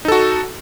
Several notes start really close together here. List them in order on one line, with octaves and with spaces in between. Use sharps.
D#4 A4 F#4